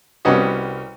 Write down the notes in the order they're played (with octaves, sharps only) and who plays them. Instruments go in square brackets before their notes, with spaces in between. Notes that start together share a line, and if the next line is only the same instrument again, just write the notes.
[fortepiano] C2 G3 B3 C#4 F#4 D#5